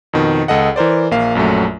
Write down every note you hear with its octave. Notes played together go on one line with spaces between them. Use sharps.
F2 B2 D#3
C#2 A4 D#5 F#5
E3 A#4 C5 D5
A#1 A#3 F5
A#1 F#2 F#3 A3